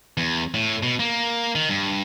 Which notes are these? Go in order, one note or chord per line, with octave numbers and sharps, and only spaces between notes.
E2
A2
B2
A#3
D#3
G2